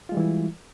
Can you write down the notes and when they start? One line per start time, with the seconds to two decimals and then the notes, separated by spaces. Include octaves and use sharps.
0.09 F4
0.12 G#3
0.14 G3
0.17 E3
0.20 E4